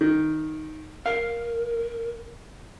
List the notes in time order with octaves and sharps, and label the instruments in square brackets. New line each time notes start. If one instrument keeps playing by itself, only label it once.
[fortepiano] D#3
[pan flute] A#4 [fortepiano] F5